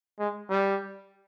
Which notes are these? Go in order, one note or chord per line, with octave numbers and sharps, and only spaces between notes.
G#3
G3